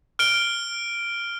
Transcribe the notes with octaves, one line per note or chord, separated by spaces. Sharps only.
F6 D7 G7